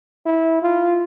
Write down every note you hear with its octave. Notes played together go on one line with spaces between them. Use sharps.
E4
F4